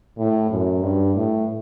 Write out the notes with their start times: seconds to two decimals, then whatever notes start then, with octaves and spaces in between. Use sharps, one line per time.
0.17 A2
0.50 F#2
0.82 G2
1.15 A2